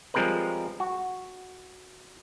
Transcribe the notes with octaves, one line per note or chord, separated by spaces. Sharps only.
F3 G3 G#3 C4 A#4 B4
F#4